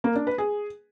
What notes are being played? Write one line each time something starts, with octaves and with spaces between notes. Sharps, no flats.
A#3
D4
B4
G#4